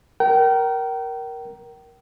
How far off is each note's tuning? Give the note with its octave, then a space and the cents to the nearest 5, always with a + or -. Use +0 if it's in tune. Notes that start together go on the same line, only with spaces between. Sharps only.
A#4 +10 G5 -35